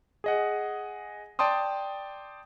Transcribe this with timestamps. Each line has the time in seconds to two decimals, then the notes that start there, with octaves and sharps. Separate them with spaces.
0.24 G#4 D#5 F#5
1.39 D5 G5 A5 C6 D#6